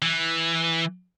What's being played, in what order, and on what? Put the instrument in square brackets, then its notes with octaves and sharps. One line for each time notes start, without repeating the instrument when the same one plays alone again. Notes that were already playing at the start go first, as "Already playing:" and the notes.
[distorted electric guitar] E3